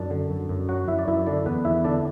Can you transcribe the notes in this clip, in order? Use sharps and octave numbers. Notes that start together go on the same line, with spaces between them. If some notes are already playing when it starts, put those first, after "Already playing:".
Already playing: F#2 D4 D5
D3
F#2
F#2
F#3 F#4 F#5
F#2 E4 E5
D5
F#2 E4 E5
D3 D4 D5
E2 B3 B4
E2 E4 E5
D3 D4 D5